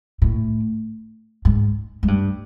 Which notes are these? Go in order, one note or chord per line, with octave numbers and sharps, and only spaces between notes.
A2
G#2
G#2
G2